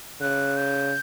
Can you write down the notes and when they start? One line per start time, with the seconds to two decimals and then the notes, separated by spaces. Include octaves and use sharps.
0.21 C#3 F#6
0.57 G6